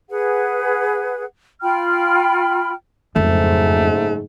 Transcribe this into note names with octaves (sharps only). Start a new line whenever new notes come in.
G#4 B4 F#5
F4 G5 B5 F6
F#1 F2 G#2 A3